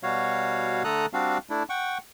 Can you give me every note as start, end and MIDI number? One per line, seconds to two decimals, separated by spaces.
0.03 0.83 47
0.03 0.83 55
0.03 0.83 66
0.03 0.83 73
0.03 0.83 77
0.84 1.06 50
0.84 1.06 57
0.84 1.06 69
0.84 1.06 82
0.84 1.06 87
0.84 1.06 90
1.13 1.38 55
1.13 1.38 60
1.13 1.38 62
1.13 1.38 66
1.13 1.38 77
1.50 1.63 57
1.50 1.63 62
1.50 1.63 64
1.69 1.98 78
1.69 1.98 79
1.69 1.98 85